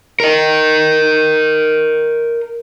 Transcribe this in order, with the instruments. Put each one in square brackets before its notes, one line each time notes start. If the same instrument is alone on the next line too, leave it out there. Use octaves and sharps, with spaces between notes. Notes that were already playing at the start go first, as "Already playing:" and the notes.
[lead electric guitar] A#4 D#5